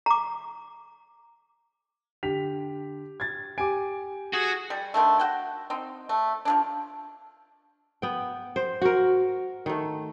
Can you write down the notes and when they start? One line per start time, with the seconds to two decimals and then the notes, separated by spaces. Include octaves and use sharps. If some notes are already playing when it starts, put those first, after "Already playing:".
0.06 A#5 D6
2.23 D3 G4 B6 F7
3.20 G#6 A6
3.58 G4 G#5 D6 D7
4.33 F#4 G#4
4.70 G3
4.94 D3 D#3 A3
5.19 F#4 G5
5.70 C4 D#4
6.09 A3
6.45 F3 G#3 D4
8.02 B3 G5
8.56 C5
8.82 F#4 A#4
9.66 D#3 A3